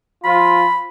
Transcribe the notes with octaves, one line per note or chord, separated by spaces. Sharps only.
F3 F4 B5